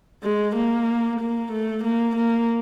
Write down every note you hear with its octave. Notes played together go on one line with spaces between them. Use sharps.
G#3
A#3
A#3
A3
A#3
A#3